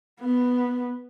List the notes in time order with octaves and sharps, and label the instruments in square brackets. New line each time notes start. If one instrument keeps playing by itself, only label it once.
[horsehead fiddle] B3